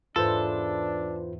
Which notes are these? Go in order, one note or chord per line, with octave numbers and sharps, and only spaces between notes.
E2 G#2 D4 F4 A4 B4 C5